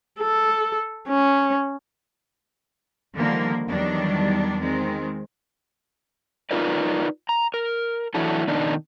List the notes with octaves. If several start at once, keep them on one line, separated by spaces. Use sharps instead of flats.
A4
C#4
D3 D#3 F3 G3 G#3 A#3
E2 D#3 F#3 G3 D4 D5
D#3 G#3 C4
D#4 F4 A#4 B4 D5
A#5
A#4
E3 F#3 D4 E4 F#4 A4
B2 D#3 D4 D#4